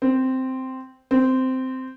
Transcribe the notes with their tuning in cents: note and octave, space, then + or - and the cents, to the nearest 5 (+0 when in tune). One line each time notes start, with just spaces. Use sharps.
C4 -5
C4 -10